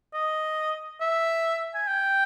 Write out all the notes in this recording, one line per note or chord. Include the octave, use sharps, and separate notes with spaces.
D#5
E5
G#5
G5